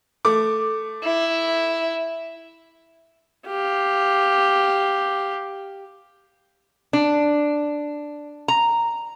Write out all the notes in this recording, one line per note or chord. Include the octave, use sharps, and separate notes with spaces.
A3 D6
E4
G4 F5
D4
A#5